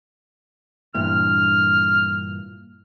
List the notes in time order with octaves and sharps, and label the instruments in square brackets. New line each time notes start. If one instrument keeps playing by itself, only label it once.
[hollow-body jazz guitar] G2 A#2 E3 [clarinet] F6